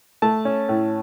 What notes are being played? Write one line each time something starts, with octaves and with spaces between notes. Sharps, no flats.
A3 A5
C#4
A2